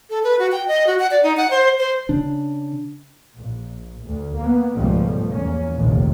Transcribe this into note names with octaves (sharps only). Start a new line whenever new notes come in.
A4
B4
F#4
G5
D#5
F#4
F#5
D5
D#4
F#5
C5
C5
C#3 D4
A#1
D2
A#3 B3
C#2 G#2 B2 F3 G3 A3
E2 A#3 C#4
F1 A#1 D#2 C3